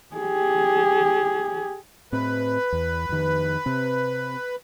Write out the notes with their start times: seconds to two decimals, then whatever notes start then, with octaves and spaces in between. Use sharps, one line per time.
0.16 G4 G#4
2.12 A2 C4 B4
2.73 E2
3.09 F2 D#3
3.66 C3 C4